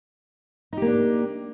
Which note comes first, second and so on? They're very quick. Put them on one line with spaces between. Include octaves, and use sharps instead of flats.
D#4 G4 A#3 D4